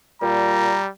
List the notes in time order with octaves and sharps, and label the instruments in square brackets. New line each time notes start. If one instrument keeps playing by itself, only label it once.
[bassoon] A#2 [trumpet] G3 [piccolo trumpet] A#5